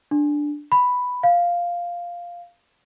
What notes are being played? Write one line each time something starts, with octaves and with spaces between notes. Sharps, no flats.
D4
B5
F5